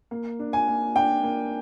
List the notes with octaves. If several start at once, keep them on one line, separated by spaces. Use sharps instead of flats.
A#3
D4
G#5
A#3
D4 G5
A#3